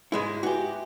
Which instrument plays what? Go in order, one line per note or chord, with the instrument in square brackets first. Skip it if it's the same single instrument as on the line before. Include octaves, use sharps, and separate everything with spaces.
[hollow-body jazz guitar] G#2 G#3 E4
[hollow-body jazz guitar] F#4 G4 [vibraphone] B4 E5 G#5